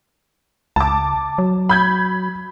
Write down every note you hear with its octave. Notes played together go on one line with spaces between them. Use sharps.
C#2 A5 D6
F#3
B5 G6 G#6